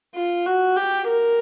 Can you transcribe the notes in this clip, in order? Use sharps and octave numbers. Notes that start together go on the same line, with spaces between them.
F4
F#4
G4
A#4